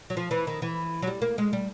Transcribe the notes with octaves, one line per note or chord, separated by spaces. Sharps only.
F#3
F3
E3
D#3
E3
F#3
G3
A#3
G#3
G3